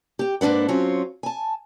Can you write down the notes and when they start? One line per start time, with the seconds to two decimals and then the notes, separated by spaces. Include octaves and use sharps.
0.19 G4 G5
0.41 G#2 A#3 D4 B4 F#5
0.68 F#3 C4 C#4 F4
1.23 G#5 A5